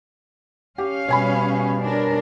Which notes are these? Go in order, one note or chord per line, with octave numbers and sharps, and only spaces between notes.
C#4 G4 F5
B2 G3 C#5 G#5 B5
D4 A#4